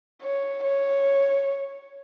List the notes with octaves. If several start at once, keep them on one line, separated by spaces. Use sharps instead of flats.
C#5
C#5